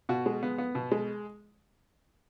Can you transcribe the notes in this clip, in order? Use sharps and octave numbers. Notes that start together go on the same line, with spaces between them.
B2 F#4
G#3
B3
B3
B2
G#3